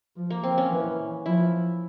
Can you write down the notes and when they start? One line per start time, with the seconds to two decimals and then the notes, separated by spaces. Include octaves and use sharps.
0.17 F3
0.30 A#3
0.43 C4
0.58 C#4
0.71 E3
1.26 F3 E4